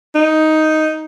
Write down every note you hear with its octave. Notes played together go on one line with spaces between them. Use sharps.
D#4